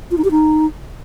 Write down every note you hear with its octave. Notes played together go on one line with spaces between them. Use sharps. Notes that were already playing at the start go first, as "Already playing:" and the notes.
F4
D#4
G4
D#4